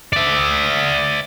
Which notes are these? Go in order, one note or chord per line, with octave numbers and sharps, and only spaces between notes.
D5 E5